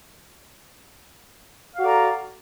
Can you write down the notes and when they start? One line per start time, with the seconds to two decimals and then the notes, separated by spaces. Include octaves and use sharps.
1.74 F5
1.77 F#4
1.80 A4
1.83 D5
1.86 A#5